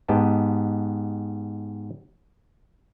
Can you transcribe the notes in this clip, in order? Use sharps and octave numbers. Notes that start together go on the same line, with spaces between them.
G#2 B3 G4 D#5 A5